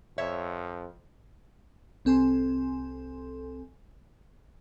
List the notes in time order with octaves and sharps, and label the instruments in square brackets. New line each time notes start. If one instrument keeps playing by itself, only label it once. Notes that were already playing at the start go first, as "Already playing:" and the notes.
[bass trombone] F2 [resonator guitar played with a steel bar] C#5 E5
[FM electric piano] C2 C4 A4 G#5 C6